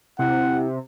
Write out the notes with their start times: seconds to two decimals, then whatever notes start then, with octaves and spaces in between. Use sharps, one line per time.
0.19 C3 E4 F#5